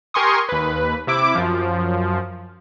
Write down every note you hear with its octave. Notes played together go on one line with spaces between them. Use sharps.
G4 A#4 G#5 C6 C#6 D#6
D#2 B4
C3 E4 D6 D7
F#2 F3